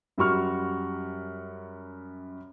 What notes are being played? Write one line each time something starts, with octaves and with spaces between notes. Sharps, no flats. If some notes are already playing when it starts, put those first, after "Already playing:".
F#2 G3 F#4 C#6 F6